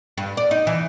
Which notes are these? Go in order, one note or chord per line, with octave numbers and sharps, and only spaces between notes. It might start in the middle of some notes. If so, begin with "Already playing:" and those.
G2
D5
D#4
E3